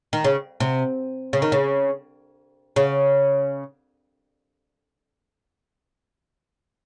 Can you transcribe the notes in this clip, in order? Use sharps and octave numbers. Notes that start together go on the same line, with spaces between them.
D#3
C#3
C3
C#3
D#3
C#3
C#3